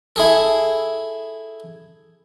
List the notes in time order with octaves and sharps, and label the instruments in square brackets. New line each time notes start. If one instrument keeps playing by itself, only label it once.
[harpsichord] E4 G#4 A4